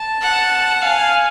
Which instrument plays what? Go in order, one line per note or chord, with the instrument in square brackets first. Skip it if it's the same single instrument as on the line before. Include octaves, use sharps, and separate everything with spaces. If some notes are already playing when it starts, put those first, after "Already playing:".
Already playing: [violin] A5
[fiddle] F#5
[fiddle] F5 [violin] G#5